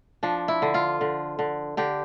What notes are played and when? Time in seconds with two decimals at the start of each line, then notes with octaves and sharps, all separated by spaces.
0.23 F3 D4
0.48 E4
0.62 D3
0.74 F4
1.01 D3
1.39 D3
1.77 D3 G4